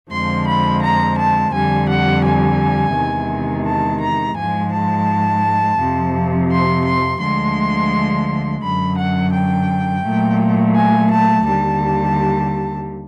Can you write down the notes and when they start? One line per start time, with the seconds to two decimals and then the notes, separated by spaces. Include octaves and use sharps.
0.12 F2 D3 F3 G#3 C6
0.47 B5
0.83 A#5
1.18 A5
1.53 F2 D3 G3 G#5
1.89 F#5
2.24 G#5
2.95 E2 C3 D#3 G#3
3.66 A5
4.01 A#5
4.36 G#2 F3 G#3 G#5
4.72 A5
5.78 F2 C3 F3
6.50 C6
6.85 C6
7.20 D2 D3 F3 G#3 C6
8.62 F#2 D3 F#3 B5
8.97 F#5
9.32 G5
10.04 A#2 F#3 A3
10.75 G#5
11.10 A5
11.45 D#2 D3 G3 A5